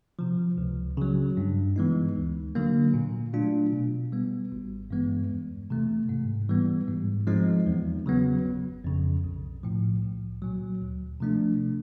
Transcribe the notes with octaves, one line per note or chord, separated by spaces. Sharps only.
C3 F3
C#2
C#3 F#3
G2
E3 G#3 B3 D#4
D2
D3 F#3 A#3
A#2
F#3 A3 D4 F4
B2
G3 B3
G#1
G2 E3 G#3 B3
E2
C3 E3 A3
G#2
E3 G3 B3
G#2
F3 G#3 C4 D#4
E2
C#3 F#3 B3
G1
F2 C#3
B1
A2 F3
C2
A#2 F#3
D2
C3 F3 A3 D4